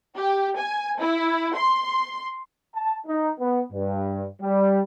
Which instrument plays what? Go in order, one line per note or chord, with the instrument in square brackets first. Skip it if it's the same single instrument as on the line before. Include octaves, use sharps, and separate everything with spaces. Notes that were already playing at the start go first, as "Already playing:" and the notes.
[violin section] G4
G#5
E4
C6
[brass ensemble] A5
D#4
B3
G2
G3